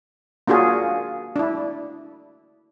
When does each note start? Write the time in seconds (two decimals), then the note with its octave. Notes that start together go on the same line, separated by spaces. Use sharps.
0.47 A#3 D4 F4 F#4 G#4
1.36 D4 E4